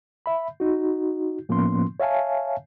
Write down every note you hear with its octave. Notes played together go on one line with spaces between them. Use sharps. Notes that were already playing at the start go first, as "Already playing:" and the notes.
E5 B5
D#4 F#4
A2 F3 A#3 B3 C#4 C6
C#5 E5 F5 G#5 A5